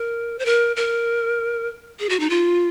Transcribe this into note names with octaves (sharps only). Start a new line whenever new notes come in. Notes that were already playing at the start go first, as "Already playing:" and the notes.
Already playing: A#4
C5
A#4
A#4
G#4
F#4
D#4
F4